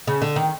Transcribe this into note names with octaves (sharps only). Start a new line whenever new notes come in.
C#3
D3
D#3